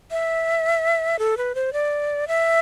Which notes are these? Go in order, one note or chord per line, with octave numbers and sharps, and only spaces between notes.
E5
A4
B4
C5
D5
E5